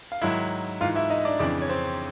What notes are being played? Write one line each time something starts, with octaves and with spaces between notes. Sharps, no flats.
F5
G#2 D#3 F#3 E4 E5
G#2 E3 F4 F5
E4 E5
D#4 D#5
D4 D5
F2 C#3 E3 D4 D5
C#5
C4 C5